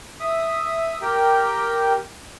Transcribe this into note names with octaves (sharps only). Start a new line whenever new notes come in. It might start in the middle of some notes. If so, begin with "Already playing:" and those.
E5 D#6
G4 A#4 G5